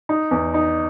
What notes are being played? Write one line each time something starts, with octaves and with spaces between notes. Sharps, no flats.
D#4
E2
D#4